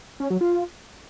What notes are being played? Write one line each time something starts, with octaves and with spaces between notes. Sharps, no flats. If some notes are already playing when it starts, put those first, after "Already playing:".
C#4
F#3
F4